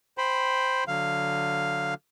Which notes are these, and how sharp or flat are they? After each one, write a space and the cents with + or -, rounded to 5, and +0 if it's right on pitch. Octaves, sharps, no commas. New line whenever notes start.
C5 +0 G5 +0 B5 +0
D3 +0 F#3 -15 F5 +0